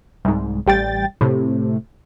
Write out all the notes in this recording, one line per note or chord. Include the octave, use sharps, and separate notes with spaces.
C2 G#2
A1 G3 G5 A6
A2 C3